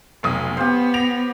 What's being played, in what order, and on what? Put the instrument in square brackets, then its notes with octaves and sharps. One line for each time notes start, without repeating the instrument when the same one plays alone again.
[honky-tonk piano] F1 B1 D#6
[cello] B3 [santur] G4 C5 [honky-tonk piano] F5
[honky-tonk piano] A#6 D7 F7